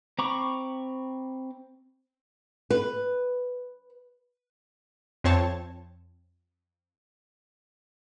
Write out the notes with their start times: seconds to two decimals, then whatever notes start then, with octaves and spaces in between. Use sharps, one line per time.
0.19 C4 A#5 B5 C#6 D6
2.70 B4
5.24 F2 C4 C#5 A5